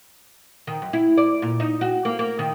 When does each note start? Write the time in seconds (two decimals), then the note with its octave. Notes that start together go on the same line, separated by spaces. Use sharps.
0.67 D#3
0.82 F#2
0.93 E4
1.17 D5
1.42 A#2
1.60 D#4
1.81 F#4
2.05 A#3
2.19 A#3
2.39 D#3